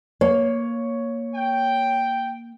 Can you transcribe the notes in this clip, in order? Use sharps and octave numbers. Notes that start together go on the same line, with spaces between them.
A#3 C#5
G5